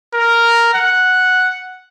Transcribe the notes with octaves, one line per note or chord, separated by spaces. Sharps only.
A#4
F#5